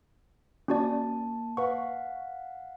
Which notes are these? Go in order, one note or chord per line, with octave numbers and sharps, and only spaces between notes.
A#3 C#4 F#4 D5 A5
B4 F5 F#5 C#6